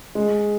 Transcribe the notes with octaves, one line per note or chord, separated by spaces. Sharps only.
G#3